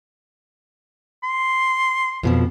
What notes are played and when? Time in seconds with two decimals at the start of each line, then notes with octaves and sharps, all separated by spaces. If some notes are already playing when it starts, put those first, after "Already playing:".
1.24 C6
2.23 F2 B2 F3